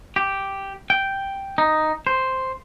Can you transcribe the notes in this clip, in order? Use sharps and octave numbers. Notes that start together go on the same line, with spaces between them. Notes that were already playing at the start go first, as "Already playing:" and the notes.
G4
G5
D#4
C5